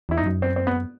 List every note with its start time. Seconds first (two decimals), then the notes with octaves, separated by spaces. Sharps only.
0.09 E2 E4
0.17 D#4
0.22 G2
0.26 F#2
0.42 C4
0.56 C4
0.67 B3